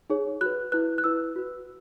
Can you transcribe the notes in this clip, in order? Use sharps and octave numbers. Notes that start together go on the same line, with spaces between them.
D#4 G#4 C#5
F#4 B4 F#6
E4 B4 F#6
F#6
E4 B4 E6
F#4 B4